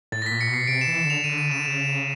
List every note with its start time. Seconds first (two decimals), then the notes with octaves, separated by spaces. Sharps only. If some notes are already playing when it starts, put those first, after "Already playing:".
0.12 A2 A6
0.22 A#6
0.26 B6
0.31 A#2
0.41 C#7
0.49 B2 C7
0.67 C3 D7
0.81 E7
0.87 E3
0.95 E7
1.05 D3
1.10 F7
1.24 D3 D#7
1.38 D#7
1.51 C#3 E7
1.59 D3
1.66 C#3 E7
1.80 E7